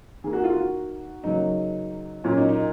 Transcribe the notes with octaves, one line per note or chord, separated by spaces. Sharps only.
D#3 A#3 G#4
F#4
F4
F#4
C#3 F#3 A#3 D#4
A#2 F#3 A#3 C#4
D#4
D#4